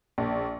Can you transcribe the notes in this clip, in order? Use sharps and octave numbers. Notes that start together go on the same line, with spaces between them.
A#1